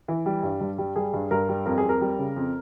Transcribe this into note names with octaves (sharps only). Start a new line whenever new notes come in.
E3
G3
G2
G2
G3
G3 G#4
G2
G2 A#4
G3
F2 A#4
G#4
F2
A#4
G3
C#3
F2